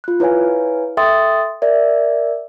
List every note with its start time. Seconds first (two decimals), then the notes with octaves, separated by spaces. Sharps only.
0.04 F4 F#6
0.20 E4 B4 C#5 F5 G#5
0.97 A4 E5 G5 C6 D#6 A6
1.62 A#4 D5 E5